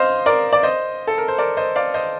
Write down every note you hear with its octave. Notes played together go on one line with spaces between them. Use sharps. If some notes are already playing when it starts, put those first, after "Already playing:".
Already playing: C5 D#5 F5
A#4 D5
D5
C5 D#5
A4
A#4
C5
A#4 D5
C5 D#5
D5 F5
C5 D#5